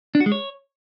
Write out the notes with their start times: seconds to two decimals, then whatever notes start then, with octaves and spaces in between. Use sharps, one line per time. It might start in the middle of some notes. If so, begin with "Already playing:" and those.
0.15 D4
0.20 F#4
0.26 G#3
0.32 C#5